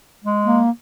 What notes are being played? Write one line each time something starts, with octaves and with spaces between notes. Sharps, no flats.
G#3
A#3